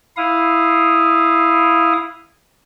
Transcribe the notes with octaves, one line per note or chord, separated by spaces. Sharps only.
E4 F5 D#6